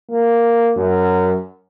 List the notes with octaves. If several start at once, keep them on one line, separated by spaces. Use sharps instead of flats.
A#3
F#2